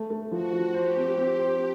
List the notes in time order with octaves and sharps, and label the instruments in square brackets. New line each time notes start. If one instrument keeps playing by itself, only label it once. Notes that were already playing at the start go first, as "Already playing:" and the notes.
Already playing: [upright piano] A3
A3
[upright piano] F3 [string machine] F#4
[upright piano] F3
[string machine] G4 [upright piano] C5
[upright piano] C4
C4
C5